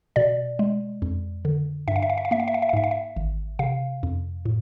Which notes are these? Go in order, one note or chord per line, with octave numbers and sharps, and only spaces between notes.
B2 D5
G#3
F2
D3
G2 E5
F5
E5
F5
E5
F5
A#3 E5
F5
E5
F5
E5
F5
G#2 E5
F5
E5
G#1
C3 F5
F2
A2